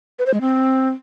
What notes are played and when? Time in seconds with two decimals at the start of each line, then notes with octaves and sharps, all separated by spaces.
0.19 B4
0.26 C5
0.34 G#3
0.41 C4